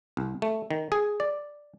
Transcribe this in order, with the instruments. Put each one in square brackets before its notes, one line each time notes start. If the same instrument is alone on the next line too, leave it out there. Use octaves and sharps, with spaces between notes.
[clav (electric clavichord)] C2
A3
D#3
G#4
D5